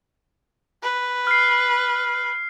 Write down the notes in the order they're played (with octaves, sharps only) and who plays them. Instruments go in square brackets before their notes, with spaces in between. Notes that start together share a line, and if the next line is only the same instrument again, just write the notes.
[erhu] B4
[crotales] F6 C7